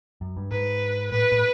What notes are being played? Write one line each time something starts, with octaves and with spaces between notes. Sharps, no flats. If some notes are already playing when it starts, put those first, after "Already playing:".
F#2
G2
G#2 B4
A2 B4
A2